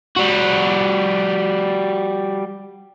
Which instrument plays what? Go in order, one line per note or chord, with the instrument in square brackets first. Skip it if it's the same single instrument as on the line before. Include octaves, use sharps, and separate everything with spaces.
[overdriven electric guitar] G3 F#4